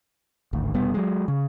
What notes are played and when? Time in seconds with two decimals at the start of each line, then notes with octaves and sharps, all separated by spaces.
0.53 D1 G#1 D2
0.74 F1 B2 G3 B3
0.94 F#3 G#3
1.28 C#3